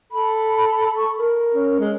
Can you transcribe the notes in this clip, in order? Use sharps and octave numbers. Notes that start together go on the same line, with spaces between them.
A4 B5
C#6
A#4
C#4
G#3